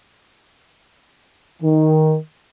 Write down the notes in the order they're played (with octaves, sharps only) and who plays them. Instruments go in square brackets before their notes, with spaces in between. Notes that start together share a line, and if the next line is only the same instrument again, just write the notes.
[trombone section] D#3